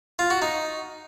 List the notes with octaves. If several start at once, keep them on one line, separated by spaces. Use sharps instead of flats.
F4
F#4
D#4